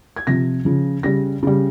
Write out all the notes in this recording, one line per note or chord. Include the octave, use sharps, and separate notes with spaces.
G#6
C3 F3 A#6
C#3 F3
C#3 G3 A#6
C#3 G3